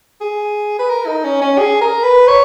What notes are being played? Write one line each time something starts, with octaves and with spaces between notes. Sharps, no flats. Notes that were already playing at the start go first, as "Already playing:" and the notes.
G#4
B4
A#4
D#4
C#4
C#4
G#4
A#4
B4
C#5